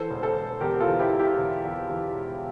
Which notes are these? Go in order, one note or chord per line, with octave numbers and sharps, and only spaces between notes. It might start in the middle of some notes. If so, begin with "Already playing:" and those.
Already playing: E3 A4 C5
E1
A4 C5
E1
E2 G4 A#4
F4 A4
E3
E4 G4
E1
E4 G4
E1
E2
E3
E1